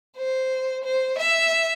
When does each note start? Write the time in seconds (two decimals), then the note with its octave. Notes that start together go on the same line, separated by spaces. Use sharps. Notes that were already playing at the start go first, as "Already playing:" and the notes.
0.17 C5
0.84 C5
1.18 E5